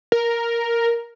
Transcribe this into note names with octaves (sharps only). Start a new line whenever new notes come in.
A#4